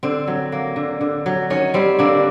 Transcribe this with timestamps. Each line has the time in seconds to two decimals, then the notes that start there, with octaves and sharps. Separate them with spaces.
0.03 D3 C4
0.28 F#3
0.52 A#3
0.76 D3
1.01 D3
1.26 F#3
1.50 D#3 C#4
1.74 G3 C4
1.99 D3 A#3 D4